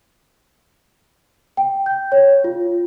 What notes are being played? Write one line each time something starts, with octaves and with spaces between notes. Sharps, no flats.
G5
G6
C#5
F4